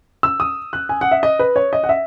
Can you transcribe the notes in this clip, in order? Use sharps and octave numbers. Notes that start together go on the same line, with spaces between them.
E6
D#6
F#6
G#5
F#5
E5
D#5
B4
C#5
D#5
F#5
E5